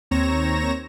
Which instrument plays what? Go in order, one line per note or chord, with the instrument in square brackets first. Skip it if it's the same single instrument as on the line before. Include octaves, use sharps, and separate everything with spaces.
[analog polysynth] D#2 C4 C#5 A#5 A#6 E7